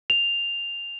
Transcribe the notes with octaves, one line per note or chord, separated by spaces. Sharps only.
F7